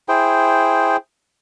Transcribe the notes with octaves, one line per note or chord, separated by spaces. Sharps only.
E4 G#4 C5 G5